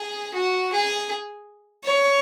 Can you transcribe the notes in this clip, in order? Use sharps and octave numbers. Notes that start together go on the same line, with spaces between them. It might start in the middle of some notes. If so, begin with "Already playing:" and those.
Already playing: G#4
F#4
G#4
C#5